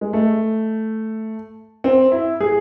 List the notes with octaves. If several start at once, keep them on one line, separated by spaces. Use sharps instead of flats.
G#3
A3
C4
E4
G#4